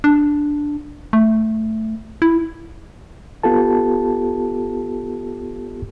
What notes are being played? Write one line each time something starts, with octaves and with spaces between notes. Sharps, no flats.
D4
A3
E4
B3 F4 G4 A4 A5